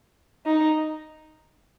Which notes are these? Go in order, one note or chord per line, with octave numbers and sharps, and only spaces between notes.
D#4